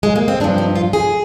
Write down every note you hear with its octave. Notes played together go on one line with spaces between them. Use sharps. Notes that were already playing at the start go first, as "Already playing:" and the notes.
G#3
A#3
C4
G2 F3 D4
D#4
F4
G#4